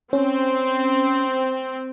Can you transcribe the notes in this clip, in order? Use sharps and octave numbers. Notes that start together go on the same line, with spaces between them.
C4 C#4